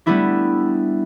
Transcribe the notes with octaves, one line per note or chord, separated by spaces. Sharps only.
G3 A3 B3 D4 E4 G4